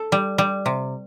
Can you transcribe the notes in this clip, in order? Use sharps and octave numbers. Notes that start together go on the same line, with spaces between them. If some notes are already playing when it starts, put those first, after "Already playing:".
Already playing: A4
G3
G3
C3